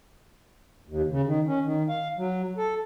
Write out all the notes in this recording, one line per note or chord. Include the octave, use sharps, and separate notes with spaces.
D#2
C#3
D#3
C#4
D#3
F5
F#3
A4